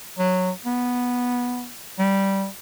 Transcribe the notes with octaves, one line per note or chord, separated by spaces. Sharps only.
F#3
B3
G3